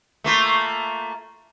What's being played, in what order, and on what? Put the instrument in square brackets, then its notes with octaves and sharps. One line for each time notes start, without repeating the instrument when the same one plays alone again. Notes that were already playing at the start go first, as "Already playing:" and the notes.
[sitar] A3 A#3 F4